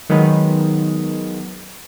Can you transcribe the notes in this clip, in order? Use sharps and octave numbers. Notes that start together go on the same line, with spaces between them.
D#3 F#3 G#3 B3 D#4